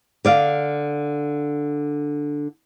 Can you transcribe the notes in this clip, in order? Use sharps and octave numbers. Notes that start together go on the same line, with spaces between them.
D3 D5 F5